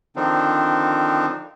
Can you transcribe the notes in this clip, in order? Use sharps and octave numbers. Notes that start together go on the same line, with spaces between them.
D3 D#3 F3 C4 D4 D#4